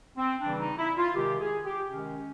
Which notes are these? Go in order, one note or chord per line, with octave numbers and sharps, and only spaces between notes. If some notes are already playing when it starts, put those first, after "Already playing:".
C4
C#3 E3 G3 D4
D#4
E4
F4
C3 D#3 G#3 G4
G#4
G4
C3 D#3 G#3 C#4